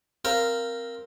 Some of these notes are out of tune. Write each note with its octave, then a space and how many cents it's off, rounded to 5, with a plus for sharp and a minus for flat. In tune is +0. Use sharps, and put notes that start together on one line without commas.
C4 +0 A#4 +0 F5 -10